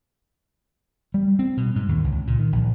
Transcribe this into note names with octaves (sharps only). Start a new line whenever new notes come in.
G3
C4
B2
G#2
D#2
C#2
A#2
D#3
A#1